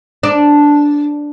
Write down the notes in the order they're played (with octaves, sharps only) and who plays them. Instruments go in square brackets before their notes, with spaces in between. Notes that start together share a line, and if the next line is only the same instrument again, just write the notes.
[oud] D4